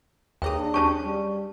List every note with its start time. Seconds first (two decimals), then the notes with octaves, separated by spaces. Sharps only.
0.42 D#2 G#4 C#5 G5 A#5 D#6
0.57 D4
0.74 F#3 C#4 G4 C#5 A5 C#6
1.05 G3